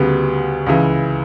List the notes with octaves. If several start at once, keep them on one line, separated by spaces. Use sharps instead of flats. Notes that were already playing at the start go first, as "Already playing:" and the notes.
Already playing: D2 C#3 G3 B3
C#2 C#3 E3